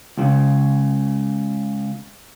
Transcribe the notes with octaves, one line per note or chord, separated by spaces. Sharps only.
C#2 A2 C#3